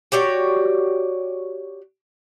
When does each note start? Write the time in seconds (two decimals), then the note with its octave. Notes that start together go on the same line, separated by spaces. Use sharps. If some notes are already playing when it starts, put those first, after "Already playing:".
0.12 F#4 G4 C#5 D5